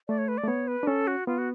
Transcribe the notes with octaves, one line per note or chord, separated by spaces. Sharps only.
A3 D5
C#5
B4
D5
A3
B3 C#5
B4
D4
C#4 A4
F#4
B3 F4
F#4